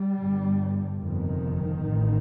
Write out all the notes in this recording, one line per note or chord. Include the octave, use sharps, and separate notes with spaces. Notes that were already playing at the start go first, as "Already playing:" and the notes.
Already playing: G3
G1 G2
G1 F2 C3 D#3
A1